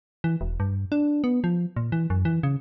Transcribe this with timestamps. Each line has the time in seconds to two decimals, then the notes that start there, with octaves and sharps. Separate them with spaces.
0.24 E3
0.41 E1
0.60 G2
0.92 D4
1.24 B3
1.44 F3
1.76 A#2
1.92 E3
2.10 F#2
2.25 E3
2.43 C#3